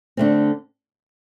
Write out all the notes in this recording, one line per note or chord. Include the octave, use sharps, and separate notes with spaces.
D3 A3 C4